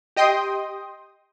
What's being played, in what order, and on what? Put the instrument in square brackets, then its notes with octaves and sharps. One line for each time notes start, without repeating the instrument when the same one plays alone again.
[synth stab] G4 D#5 G5 C6 D#6